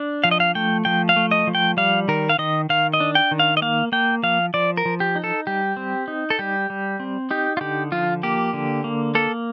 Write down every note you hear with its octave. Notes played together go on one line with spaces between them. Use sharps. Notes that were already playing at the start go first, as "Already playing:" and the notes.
Already playing: D4
F3 F5
D#5
F5
A3 G5
F3 G5
F5
A3
D#5
F3
G5
G3 F5
D#3 A#4
F5
D#3 D#5
D#3 F5
D#5
D4
G5
D#3
F5
D#5
A#3 F5
A#3 G5
F3 F5
F3 D5
A#4
F3
G4
D#4
A4
G3 G4
C4
D#4
A4
G3 G4
G3
C4
D#4 G4
F4
D3 G4
F3 F4
A#3 G4
D3
A#3
A#3 A4